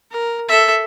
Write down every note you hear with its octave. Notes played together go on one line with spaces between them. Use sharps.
A#4
A4 E5